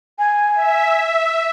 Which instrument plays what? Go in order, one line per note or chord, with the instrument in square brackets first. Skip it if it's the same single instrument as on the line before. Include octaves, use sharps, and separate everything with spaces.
[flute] G#5
[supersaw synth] E5